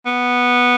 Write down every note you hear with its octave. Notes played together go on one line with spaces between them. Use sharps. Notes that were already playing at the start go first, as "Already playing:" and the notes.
B3